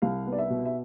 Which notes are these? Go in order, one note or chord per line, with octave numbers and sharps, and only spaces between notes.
C2 F5
B3
D5
E5
B2
E5